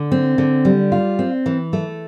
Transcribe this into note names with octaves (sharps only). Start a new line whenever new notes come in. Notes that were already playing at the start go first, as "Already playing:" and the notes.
Already playing: D3
C4
D3
G3
F4
C4
E3
A3